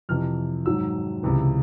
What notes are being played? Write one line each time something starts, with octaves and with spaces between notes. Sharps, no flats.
F2 C3 E3 F6
G#2 D#3 F#3 E6
C#2 C3 E3